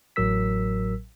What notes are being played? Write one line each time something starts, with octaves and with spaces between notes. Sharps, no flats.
A1 A2 F#3 A#4 E6 B6